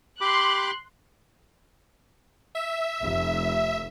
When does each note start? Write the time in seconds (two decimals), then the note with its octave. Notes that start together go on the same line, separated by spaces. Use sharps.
0.21 G4 B5 C6 D6 F#6
2.55 E5
3.00 F1